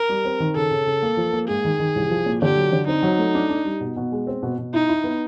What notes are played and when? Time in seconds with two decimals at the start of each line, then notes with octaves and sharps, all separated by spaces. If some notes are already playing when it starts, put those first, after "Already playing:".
Already playing: A#4
0.09 G3
0.25 C4
0.40 D#3
0.56 C#3 A4
0.71 C#3
0.86 C#3
1.03 A#3
1.17 F3
1.33 A#3
1.48 G#2 G#4
1.65 D#3
1.80 D#3
1.96 C2
2.10 F3
2.26 A#2
2.42 D3 G4
2.57 F#3
2.72 D3
2.88 C4 D#4
3.03 F#3
3.19 A3
3.34 D4
3.50 D4
3.65 G3
3.81 B2
3.96 B2
4.12 G#3
4.27 C4
4.43 B2
4.58 B2
4.74 D#4 E4
4.89 E4
5.04 B3